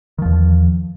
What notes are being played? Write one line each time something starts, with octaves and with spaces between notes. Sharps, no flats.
E2 D#3 F3